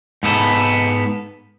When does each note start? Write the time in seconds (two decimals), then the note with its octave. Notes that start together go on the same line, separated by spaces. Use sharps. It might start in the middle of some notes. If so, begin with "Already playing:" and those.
0.23 G#2 B3 A4